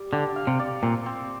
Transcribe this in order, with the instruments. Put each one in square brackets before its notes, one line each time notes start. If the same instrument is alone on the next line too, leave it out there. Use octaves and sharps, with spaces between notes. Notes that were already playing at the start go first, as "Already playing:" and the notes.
Already playing: [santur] G3
[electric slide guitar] D3 [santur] G4
[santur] F5
[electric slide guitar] C3
[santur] D5
[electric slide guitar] A#2 [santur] C4
[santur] C4